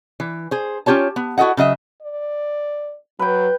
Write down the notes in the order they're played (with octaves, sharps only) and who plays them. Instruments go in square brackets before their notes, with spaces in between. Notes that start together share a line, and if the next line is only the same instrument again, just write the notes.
[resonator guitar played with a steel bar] E3
G#4 C5
C#4 F4 G4 C#5 A5
B3
E4 F#4 A4 D#5 F#5
C#3 F#3 D#5 E5
[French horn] D5
[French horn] F#3 [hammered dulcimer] B4 G5